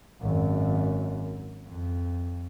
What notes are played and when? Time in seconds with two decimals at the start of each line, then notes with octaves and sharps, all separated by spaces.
0.21 G#1 F#2
1.67 F2